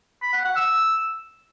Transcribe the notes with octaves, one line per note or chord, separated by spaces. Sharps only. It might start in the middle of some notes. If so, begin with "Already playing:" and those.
B5
F#5
F#5
E6